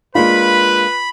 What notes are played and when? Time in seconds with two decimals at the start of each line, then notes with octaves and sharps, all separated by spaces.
0.15 G#3 A#3 D4 F4 B4 B5